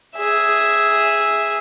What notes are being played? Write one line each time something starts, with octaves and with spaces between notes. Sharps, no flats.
G#4 E5